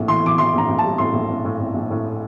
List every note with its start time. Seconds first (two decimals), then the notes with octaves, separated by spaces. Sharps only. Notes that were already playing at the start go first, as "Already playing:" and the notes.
Already playing: A#1 A2
0.08 E3 C6
0.23 E3 D6
0.38 E3 C6
0.53 A#1 A#5
0.69 A#1
0.78 A5
0.84 G3
0.98 A2 C6
1.14 A#1
1.30 A2
1.45 A2
1.60 A2
1.74 A#1
1.91 A2